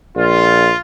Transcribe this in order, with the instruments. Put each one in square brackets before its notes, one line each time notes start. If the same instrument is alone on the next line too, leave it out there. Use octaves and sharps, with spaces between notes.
[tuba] A#1 [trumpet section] F4